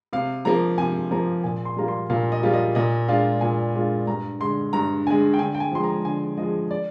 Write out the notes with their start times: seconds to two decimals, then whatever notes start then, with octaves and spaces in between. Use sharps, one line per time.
0.13 C3 F5
0.45 F3 A#3 A#5
0.78 C3 G#5
1.11 F3 A#3 A#5
1.44 A#2 G#5
1.65 C6
1.76 G3 A#3 F4 A#5
1.88 C6
2.10 A#2 F5
2.32 D#5
2.43 G3 A#3 F4
2.54 D#5
2.75 A#2 D#5
3.08 G#3 D4 F4 F5
3.41 A#2 G#5
3.74 G#3 D4 F4
4.07 G2 A#5
4.40 D3 G#3 C6
4.73 G2 A#5
5.05 D3 G#3 G#5
5.34 G5
5.39 D3 G#5
5.55 G5
5.60 G#5
5.72 F3 G#3 C6
5.83 A#5
6.05 D3 G#5
6.37 F3 G#3 D#5
6.71 D5